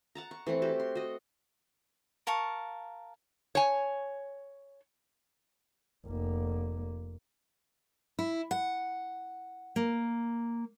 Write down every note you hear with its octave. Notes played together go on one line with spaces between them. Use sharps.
F#5 A5 A#5
C#6
E3 A3 C4 F#5
F#4 G4 A4
C6
F#4 D#5
A#4 F5 A5 C#6
C#5 G#5
F1 A#3
E4
F#5
A#3